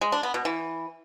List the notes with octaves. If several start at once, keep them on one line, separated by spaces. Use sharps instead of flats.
G#3
D4
B3
B2
E3